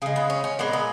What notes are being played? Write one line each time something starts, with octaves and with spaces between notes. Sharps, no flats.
C#3 G#3 G#4
B3
C#4
C#4
A#2 G#3 B3
B3